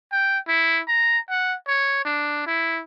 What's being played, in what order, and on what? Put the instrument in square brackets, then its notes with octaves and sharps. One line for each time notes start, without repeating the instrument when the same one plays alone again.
[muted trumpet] G5
E4
A#5
F#5
C#5
D4
E4